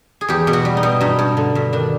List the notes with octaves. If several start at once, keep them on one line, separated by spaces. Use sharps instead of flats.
G#4
E2 G4
B2
F#4
G3
D#4
B2
G2 D#4
G2
D3
G2
D#3 D4